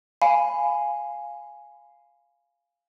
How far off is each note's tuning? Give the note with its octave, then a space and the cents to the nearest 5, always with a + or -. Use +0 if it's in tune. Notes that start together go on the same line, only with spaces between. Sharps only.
F5 +0 G#5 +0 B5 +10